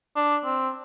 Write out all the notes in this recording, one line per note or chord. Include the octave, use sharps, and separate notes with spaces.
D4
C4